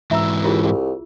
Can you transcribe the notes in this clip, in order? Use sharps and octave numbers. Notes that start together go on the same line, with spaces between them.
G#2 E3 E5 A#5 E6
D#2 E4 F4 G#4
C2